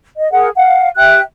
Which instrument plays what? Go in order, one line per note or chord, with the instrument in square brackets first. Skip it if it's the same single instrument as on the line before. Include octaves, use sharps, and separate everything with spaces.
[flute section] D#5
G#4 A#4 F#5
F5 F#5
G4 E5 G5 F#6